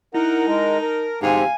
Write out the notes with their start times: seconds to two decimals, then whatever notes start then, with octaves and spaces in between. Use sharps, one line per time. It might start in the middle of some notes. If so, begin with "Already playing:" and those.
0.14 D#4 E4 A#4 F#5
0.47 G#3 A#4 A5
0.81 A#4
1.22 G#2 C4 G4 F5 G#5